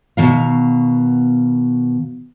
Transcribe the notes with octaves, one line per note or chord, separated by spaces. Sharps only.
B2 D#3 F5